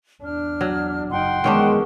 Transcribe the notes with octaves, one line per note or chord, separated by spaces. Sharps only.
E2 D4 F6
F#3
F#1 D#4 F#5 G5 C6
D#3 E3 G#3 B3 C#4 D4